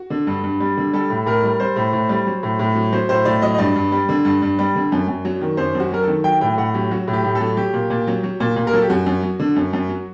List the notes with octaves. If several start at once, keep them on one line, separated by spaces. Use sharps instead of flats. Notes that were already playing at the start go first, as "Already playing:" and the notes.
Already playing: F#4
D3
G2
G2
G3
D3
G3 A4
A2
A2 A#4
G3
G3 C5
A2
A2
G3
F#3
A2
A2
F#3
F#3 C5
A2 C5
A2 D5
F#3 D#5
D#5
G2 D5
G2
G3
D3
G2
G2
G3
D3
F#2
F#2
F#3
D#3
F#2 C5
F#2 F#4
F#3 A#4
A4
D#3
F#3 G5
A2 G5
A2 F#5
F#3 G4
F#3 F#4
A2
G4
A2
A4
F#3
F#3 G4
A#2
A#2
F#3
F#3
A#2
A#2
A#4
F#3 A4
G4
F#2 F#4
F#2
F#3
D3
F#2
F#2
F#3